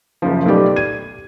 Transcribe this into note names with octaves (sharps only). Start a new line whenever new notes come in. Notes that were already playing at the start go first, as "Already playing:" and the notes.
F#1 C#3 F3
B1 A3 B3 G4 D5
G#6 D#7